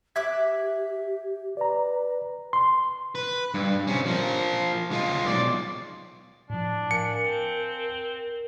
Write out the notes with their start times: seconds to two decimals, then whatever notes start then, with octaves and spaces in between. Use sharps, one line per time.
0.16 G4 E5 D6 F#6 G#6
1.57 B4 D5 A#5
2.53 C6
3.15 B4
3.54 G2
3.87 C3 C#4
4.06 F3 A#4
4.91 G#3 F4
5.27 B1 D5
6.50 A2 F3 D4
6.91 A#4 F5 G#5 A5 C#7
7.24 C4